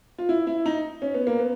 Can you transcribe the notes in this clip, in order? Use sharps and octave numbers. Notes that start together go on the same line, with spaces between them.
F4
E4
E4
D#4
C#4
B3
A#3
B3